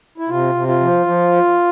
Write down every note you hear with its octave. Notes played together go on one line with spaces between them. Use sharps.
E4
C3 F4
C3
F4
F3
F3